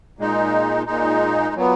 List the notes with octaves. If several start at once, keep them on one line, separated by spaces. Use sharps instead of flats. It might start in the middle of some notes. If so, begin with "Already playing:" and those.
A#2 G#3 D#4
A#2 G#3 D#4
A#2 F#3 B3